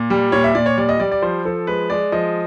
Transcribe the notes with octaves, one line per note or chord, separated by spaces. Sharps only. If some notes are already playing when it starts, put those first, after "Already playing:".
Already playing: A#2
G3
A#2 C#5
E5
A#2 D5
C#5
G3 D5
D#5
G3 D5
D5
F3 C5
F3 A4
G#3 B4
G#3 D5
F3 D#5